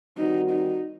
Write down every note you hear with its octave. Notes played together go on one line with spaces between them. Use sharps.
D#3 G3 C4 D#4 F#4
D#4